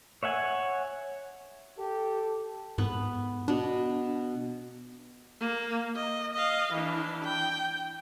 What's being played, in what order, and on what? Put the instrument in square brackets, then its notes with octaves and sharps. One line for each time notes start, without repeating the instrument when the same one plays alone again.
[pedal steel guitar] C#5 E5 F#5 G#5
[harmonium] G4 [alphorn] A4
[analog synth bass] G#2 [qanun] B3 B4
[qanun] B2 B3 [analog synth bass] D4
[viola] A#3
D#5
D#5 F5
E3 D4
G5